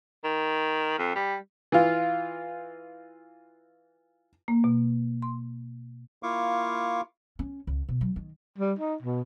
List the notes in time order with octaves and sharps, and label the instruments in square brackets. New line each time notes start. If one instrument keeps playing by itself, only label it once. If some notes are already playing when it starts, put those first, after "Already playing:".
[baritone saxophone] D#3
F2
G3
[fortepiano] E3 F4
[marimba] A#3
B2
C6
[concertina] A#3 E4 F4 F5 C#6 D6
[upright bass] C#4
C#2
B2
F#3
D#3
[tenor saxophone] G3
D#4
B2